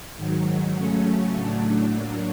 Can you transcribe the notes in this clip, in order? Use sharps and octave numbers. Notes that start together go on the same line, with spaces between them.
G#2 D#3 F#3
C#3 F#3 A3 C#4
A2 F#3 A3 D4
A2 F#3 A#3 D4